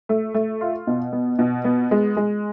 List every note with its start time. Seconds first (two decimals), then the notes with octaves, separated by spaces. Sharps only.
0.09 A3
0.34 A3
0.61 F4
0.87 B2
1.12 B3
1.39 B2
1.65 B3
1.91 G#3
2.17 G#3